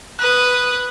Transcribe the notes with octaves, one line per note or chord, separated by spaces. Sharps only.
B4 D#6 F#6